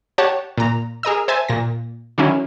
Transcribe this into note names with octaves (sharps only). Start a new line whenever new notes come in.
G4 C#5 F#5 A5
A#2 A#5
G#4 A#4 D#5 E6
C5 E5 G#5 A5
A#2 A#6
D3 D#3 F#3 C#4 E4